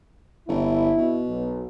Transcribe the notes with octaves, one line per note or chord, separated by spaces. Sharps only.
G1 E4
B2
B1